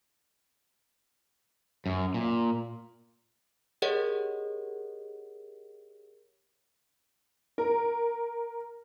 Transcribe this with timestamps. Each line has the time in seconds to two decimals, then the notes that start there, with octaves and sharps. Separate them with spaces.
1.86 F#2
2.14 A#2
3.82 G4 G#4 A#4 C#5 D#5 F#5
7.58 A#4